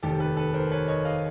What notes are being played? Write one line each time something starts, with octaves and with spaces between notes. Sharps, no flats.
F1 D#2 D#3 G4 A4
A4 B4
A4 B4
A#4 C5
B4 C#5
C#5 D#5
D#5 F5